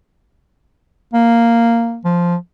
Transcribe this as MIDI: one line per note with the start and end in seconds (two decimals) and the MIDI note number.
1.14 2.00 58
2.05 2.36 53